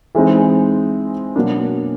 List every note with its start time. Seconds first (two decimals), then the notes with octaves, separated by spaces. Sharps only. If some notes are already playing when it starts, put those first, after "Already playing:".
0.15 E3 G#3 C4 D#4
1.36 B2 F#3 A#3 D4